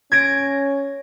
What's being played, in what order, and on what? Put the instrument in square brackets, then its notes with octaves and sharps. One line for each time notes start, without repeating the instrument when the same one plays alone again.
[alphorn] C#4 [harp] G#6 A#6 D7